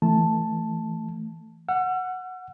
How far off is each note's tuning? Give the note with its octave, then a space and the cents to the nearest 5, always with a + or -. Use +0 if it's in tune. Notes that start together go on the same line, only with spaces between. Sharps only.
E3 +0 A3 +0 A5 +0
F#5 -5 E6 +45